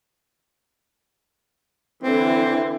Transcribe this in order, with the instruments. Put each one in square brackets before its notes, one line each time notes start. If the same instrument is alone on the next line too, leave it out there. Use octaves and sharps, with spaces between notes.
[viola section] D3 E3 [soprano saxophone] C4